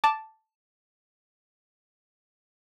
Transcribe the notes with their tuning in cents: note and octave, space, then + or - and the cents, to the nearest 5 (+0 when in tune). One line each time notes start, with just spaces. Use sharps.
A5 +0 D6 +0